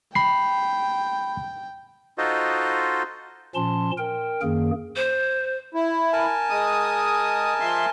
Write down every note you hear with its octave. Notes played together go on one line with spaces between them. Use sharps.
G5 B5 C7
D#4 F4 F#4 A4 C5 D#5
A#2 F3 C#4 A5 C6
A#4 G5
F#2 D#3 A#3 G#4
C5
E4
A#4 G#5 A5
G#3 D#6
F3 E5 C6